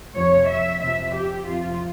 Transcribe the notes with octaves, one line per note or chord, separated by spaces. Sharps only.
F2 C3 F3 C#5
E5
F2 C3 F3 E5
G4
F2 C3 F3 F4